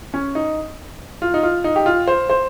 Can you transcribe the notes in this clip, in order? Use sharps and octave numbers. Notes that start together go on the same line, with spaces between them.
C#4
D#4
F4
D#4
F4
D#4
G4
F4
C5
C5